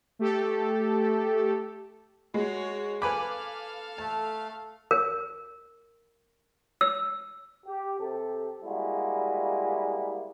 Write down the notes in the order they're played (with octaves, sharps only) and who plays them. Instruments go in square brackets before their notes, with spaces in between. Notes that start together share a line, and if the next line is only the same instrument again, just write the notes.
[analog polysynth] A3 G4 A4
[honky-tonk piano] G#3 [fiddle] F#4 C#5
[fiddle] A4 F5 [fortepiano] B4 G#5 B5 [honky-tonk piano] D6
[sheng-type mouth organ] A3 [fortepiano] A5
[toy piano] A#4
E6
[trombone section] G4
C3 G4 A4
G3 G#3 A#3 E4 F#4